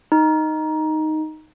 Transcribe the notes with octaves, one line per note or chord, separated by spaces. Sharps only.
D#4